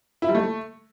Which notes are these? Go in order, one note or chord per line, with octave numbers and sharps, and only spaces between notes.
E4
G3
A3